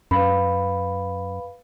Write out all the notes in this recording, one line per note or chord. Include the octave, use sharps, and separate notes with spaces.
F#2 B4 F5 B5